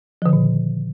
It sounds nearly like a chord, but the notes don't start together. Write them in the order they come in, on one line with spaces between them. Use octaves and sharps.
F3 D3 D#3 A#2